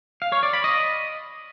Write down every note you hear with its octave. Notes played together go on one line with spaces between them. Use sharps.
F5
C#5
D5
B5
D#5